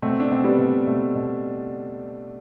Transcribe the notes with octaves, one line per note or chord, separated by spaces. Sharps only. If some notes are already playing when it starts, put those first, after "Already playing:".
B2 A3 C4
D4
B2 C4
G3 B3
B2
B2 A3
B2